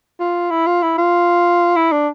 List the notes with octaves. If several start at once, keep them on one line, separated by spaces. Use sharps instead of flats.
F4
E4
F4
E4
F4
E4
D4